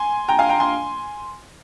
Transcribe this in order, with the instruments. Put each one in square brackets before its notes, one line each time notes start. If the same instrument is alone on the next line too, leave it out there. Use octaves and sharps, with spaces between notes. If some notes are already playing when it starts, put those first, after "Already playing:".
Already playing: [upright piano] G#5 C6
G5 A#5
F5 G#5
G5 A#5
G#5 C6